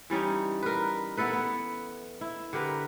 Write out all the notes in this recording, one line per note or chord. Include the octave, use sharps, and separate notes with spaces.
E3 G3 C#4 D#4
A#4 B4
B3 E4 A4 B4
B3
E4
D3 G4 A#4 B4